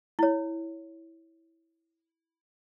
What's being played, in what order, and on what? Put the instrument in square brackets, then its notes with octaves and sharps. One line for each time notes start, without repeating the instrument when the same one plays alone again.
[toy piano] E4 C#5